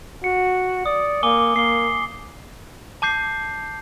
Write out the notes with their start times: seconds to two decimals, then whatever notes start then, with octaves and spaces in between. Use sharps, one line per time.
0.24 F#4 C#7
0.86 D5 D#6
1.23 A#3 G#5 D6 G7
1.56 A#3 C7 G7
3.02 A5 D6 G6 C7